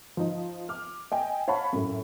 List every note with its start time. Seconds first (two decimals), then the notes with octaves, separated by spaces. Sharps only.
0.17 F3 D#4
0.69 D6 F6
1.12 D#5 G5 G#5
1.48 C#5 F5 F#5 A5 B5
1.73 F#2 A2